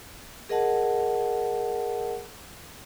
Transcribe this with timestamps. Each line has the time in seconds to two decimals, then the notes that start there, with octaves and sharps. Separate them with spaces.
0.49 G#4 A#4 D#5 F#5 A5